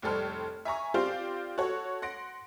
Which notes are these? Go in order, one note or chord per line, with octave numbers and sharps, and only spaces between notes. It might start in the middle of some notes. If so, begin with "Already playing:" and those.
F1 A2 G3 A4 C5 F6
E5 G#5 A#5 C#6
C4 F4 G4 C5 D5 F5
F#4 A4 C#5
F#5 C6 A#6 D7